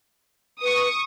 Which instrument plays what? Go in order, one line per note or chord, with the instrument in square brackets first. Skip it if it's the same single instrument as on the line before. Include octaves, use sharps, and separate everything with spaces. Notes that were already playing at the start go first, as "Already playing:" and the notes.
[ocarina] B4 [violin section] C#6 D#6